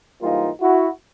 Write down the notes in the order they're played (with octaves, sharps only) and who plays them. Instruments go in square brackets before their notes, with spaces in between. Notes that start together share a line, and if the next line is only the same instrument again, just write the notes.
[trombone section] G#2 E3 G3 A#3 D#4 F4
E4 F#4